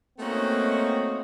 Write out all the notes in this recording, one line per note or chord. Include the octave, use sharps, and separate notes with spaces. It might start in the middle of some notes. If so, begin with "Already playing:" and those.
A3 A#3 C4 C#4 D#4 F#4